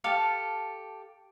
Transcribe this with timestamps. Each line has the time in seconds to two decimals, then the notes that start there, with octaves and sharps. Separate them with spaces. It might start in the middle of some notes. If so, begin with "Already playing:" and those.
0.04 G4 A4 F5 A5